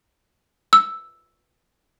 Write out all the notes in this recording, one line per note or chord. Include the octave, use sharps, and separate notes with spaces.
E6